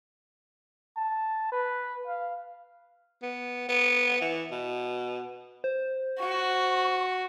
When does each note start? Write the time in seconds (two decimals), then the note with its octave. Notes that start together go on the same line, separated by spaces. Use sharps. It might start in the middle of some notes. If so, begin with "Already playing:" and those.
0.97 A5
1.52 B4
2.07 F5
3.22 B3
3.69 B3
4.21 E3
4.52 B2
5.64 C5
6.19 F#4 C#6